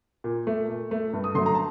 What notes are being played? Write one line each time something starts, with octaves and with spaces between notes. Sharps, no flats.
A#2
A3
A#2
A3
G2
D#6
D3 F#3 A3 C6
A#5
A5